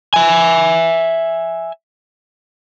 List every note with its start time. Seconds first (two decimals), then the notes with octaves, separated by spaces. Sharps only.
0.14 E5 G#5